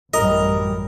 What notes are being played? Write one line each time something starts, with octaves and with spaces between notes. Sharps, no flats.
A1 F#2 G3 A#4 D#5